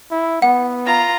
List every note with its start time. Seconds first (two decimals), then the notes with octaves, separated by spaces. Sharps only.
0.11 E4
0.42 B3 F#5
0.85 F4 A#5